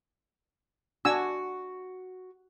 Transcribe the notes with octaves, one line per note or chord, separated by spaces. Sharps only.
D4 F#4 G#5 E6